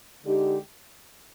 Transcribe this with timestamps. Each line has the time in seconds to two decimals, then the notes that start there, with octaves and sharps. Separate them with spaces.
0.23 D3 G#3 D#4 G4